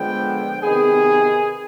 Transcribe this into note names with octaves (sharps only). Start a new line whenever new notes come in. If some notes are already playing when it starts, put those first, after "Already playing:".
Already playing: D3 F3 G#3 B3 G5
C3 D#3 B3 G#4